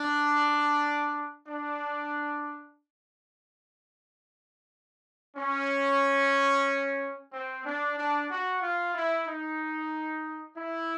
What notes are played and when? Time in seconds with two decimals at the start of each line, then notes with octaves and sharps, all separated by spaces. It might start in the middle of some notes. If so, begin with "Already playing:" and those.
Already playing: D4
1.47 D4
5.36 C#4
7.32 C4
7.64 D4
7.97 D4
8.29 F#4
8.62 F4
8.94 E4
9.27 D#4
10.57 E4